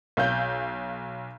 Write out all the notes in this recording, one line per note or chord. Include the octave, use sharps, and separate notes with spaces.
B1 F5 G6